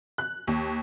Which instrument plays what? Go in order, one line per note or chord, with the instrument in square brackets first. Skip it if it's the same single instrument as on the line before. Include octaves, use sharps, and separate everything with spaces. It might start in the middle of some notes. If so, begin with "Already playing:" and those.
[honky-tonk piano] F#6
D#2